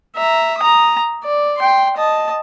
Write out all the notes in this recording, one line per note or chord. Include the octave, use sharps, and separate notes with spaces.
E5 A#5
A#5 D#6
D5
G5 C6
D#5 A5